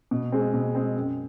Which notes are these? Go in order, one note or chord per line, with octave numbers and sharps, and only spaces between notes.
B2
G#3 C4
B2
G#3 C4
F#2